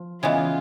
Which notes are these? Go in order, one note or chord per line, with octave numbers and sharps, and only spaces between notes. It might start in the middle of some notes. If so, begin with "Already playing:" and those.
Already playing: F3
C#3 E3 G#3 B3 F4